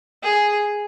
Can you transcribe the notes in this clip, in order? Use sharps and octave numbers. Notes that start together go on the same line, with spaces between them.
G#4